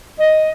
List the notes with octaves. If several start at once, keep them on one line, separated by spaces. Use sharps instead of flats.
D#5